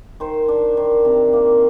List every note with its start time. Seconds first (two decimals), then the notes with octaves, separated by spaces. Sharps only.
0.20 D#3 C5
0.48 D4
0.77 D#3
1.05 C3
1.33 A#3